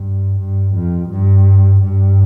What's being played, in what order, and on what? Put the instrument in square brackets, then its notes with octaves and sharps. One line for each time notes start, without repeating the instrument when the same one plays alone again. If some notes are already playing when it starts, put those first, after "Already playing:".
Already playing: [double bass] G2
G2
F2
G2
G2